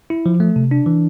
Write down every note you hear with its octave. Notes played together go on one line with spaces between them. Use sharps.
E4
F3
A3
C3
D4
E3